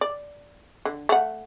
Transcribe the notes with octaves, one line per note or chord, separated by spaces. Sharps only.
D5
D3
A3 F#5